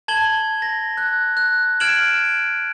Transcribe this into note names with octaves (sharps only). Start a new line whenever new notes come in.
A5 G#6 F#7 G7
A#6
F#6
F#6
F6 G#6 D7 E7 F#7